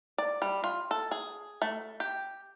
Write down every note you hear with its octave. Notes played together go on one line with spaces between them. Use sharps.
D5
G3
F4
A4
G#4
A3
G4